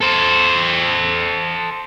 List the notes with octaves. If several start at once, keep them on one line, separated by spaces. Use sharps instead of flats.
A4 C5